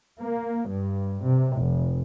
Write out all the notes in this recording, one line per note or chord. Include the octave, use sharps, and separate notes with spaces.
A#3
G2
C3
F1